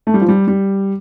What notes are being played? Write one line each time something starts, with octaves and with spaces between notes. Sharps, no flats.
A3
G3
F3
G3
G3